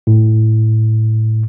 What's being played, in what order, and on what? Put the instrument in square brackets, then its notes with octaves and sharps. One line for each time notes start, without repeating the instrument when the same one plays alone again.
[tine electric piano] A2